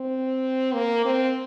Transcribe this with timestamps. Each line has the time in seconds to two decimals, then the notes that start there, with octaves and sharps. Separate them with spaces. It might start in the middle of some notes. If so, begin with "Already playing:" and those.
Already playing: C4
0.74 A#3
1.05 C4